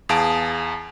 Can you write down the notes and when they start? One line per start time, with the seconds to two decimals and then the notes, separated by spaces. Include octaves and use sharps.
0.09 E2 G#4 F5 A5 D7